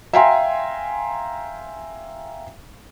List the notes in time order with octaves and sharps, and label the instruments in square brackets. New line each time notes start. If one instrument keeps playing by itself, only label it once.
[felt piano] E5 F5 G5 G#5 A#5 C6